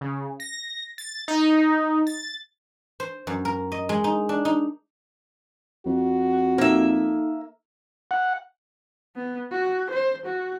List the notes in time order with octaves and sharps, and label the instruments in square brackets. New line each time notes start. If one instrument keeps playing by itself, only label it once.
[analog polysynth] C#3
A#6
A6
D#4
A6
[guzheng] C5
F#2
A#4
D#5
G#3
D#4
D4
D#4
[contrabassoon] F2 [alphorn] F#4
[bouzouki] A#3 E5 [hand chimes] D#4 A4
[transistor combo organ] F#5
[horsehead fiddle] B3
F#4
C5
F#4